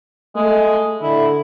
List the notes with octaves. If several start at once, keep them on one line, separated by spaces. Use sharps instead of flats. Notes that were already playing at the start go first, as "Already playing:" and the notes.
G#3 A3
D3 E4